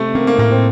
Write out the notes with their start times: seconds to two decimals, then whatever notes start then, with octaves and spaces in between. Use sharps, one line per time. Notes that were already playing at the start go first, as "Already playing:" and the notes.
Already playing: C3 A3
0.15 A#3 C4
0.27 A#3
0.38 A2 A#3
0.51 C4